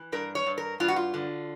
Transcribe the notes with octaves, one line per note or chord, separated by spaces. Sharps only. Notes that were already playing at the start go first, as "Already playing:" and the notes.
Already playing: E3
G2 A#4
C#5
G2
A#4
G2 F4
F#4
F4
D3